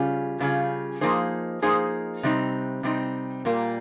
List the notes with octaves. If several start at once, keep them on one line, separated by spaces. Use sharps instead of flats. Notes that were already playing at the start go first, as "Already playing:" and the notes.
Already playing: C#3 G3 C#4 F4 G#4
C#3 G3 C#4 F4 G#4
F3 A#3 D#4 G#4 C5
F3 A#3 D#4 G#4 C5
C3 G3 C4 D#4
C3 G3 C4 D#4
A#2 G3 A#3